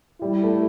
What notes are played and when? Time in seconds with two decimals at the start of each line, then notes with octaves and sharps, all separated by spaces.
0.21 G3 E4
0.43 A3